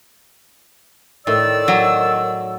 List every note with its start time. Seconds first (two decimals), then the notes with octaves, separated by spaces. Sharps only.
1.27 A2 D#3 D5 E6
1.68 F#3